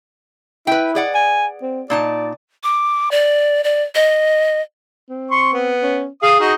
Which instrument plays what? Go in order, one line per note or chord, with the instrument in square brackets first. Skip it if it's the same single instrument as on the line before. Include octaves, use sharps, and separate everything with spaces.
[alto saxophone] E4 [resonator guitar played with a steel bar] B4 G5
[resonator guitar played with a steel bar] G#4 D5 F#5
[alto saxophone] G#5
C4
[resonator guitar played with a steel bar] A#2 D#4 A5 [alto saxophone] D5
[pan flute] D6
D5
D5
D#5
[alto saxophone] C4
[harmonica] C6 C#6
B3
[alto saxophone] C#4
[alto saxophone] G#4 [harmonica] F5 D#6
[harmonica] D#4 F#4